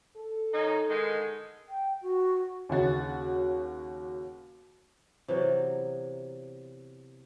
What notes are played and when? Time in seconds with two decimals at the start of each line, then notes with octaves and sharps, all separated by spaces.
0.17 A4
0.53 D#3 C#4 D#4
0.90 D3 D#3 G#3
1.69 G5
2.02 F#4
2.69 D#2 C#3 F#4 A6
5.28 C3 E3 F#3 B3